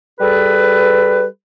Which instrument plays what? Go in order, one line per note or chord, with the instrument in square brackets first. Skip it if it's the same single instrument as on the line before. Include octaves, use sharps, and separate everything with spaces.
[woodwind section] G3 G#4 A4 B4